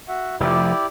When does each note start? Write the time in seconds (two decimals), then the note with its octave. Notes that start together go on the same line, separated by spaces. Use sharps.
0.08 F#4 E5 F#5
0.40 F1 F3 E4 G4 D5